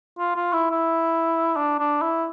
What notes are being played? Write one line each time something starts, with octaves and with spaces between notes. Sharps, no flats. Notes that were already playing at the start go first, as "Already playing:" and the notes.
F4
F4
E4
E4
D4
D4
E4